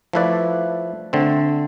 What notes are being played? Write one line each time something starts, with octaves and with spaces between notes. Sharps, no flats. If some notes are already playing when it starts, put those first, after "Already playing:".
F3 A3 E4 B4 D5
D3 A3 C4